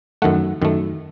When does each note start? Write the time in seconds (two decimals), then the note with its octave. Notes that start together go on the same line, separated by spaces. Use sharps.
0.22 F#2 D#3 A3 F#5
0.62 F#2 D#3 A3